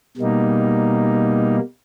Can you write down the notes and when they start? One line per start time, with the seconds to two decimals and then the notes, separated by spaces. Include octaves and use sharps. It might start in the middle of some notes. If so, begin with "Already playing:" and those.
0.17 B2 G3 A#3 D#4